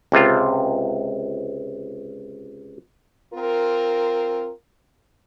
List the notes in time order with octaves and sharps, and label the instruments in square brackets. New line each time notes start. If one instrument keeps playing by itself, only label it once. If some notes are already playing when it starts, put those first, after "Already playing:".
[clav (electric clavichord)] C#2 C3 F4
[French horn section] C4 F4 A#4